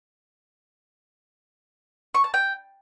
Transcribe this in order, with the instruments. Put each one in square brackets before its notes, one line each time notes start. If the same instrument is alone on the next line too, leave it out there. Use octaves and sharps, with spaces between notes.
[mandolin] C#6
A5
G5